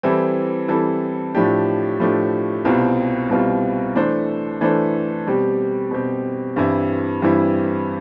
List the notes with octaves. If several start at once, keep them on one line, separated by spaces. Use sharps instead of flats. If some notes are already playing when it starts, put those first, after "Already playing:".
E3 G3 C4 E4 A4
E3 G3 C4 E4 A4
A2 F3 A3 D4 G4
A2 F3 A3 D4 G4
C2 B2 G3 C4 F4
C2 B2 G3 C4 F4
E3 A3 D4 A4 C5
E3 A3 D4 A4 C5
B2 G3 C4 G4
B2 G3 C4 G4
G2 E3 G3 C4 E4
G2 E3 G3 C4 E4